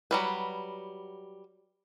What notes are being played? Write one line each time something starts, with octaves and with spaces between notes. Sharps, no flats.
F#3 G3 B4